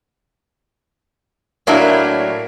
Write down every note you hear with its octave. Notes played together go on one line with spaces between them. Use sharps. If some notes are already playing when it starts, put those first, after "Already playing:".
A2 F#3 A#3 D4 E4